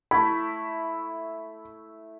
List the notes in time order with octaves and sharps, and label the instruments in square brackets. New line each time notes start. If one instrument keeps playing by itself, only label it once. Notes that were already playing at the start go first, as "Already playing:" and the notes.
[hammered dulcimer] A3 E4 [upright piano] B5